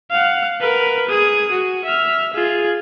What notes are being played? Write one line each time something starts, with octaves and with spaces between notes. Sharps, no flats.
F5 F#5
A#4 B4
G#4 D#6
F#4
E5 F6
F4 G#4